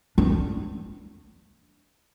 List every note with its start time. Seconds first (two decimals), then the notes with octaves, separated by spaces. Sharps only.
0.18 D4